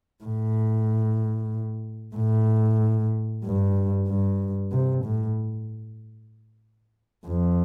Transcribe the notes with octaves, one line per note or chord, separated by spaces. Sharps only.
A2
A2
G2
G2
C3
A2
F2